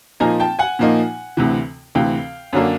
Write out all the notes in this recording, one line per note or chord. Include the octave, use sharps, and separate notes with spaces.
A#2 F3 A#3 D#4 G#5 A#5
G5 A5
F#5 G#5
A#2 F3 A#3 D#4
D2 C3 E3
D2 C3 E3 F5 G5
F#2 D3 F#3 A#3 D4